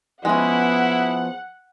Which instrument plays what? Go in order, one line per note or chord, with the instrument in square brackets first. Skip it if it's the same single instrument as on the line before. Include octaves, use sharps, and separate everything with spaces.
[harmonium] F3 B3 [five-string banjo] G#3 C#4 [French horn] E4 [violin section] F#5